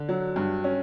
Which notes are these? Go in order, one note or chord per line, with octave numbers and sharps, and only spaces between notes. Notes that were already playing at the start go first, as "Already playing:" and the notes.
Already playing: D3
F#3
G2
C#4